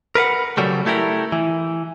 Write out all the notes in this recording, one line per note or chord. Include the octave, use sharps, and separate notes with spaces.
A#4 B4 F5 F#5
C#3 F#3 G3 A3
A3 E4 G4 A#4
E3